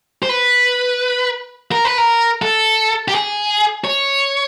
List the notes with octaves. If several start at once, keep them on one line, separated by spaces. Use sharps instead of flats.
C5
B4
A#4
B4
A#4
A4
G4
G#4
C#5